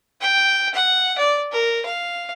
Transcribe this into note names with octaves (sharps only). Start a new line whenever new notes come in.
G5
F#5
D5
A#4
F5